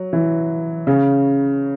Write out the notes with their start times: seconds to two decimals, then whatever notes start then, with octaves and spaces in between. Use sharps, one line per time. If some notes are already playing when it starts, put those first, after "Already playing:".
Already playing: F#3
0.13 E3
0.87 C#3